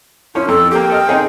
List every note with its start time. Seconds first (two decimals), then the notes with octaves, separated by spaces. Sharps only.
0.35 F3 C#4 E4 C#5
0.48 F2 A4
0.72 A#3 G4 G5
0.90 A4 D#5 F6
1.09 C3 D#4 G#4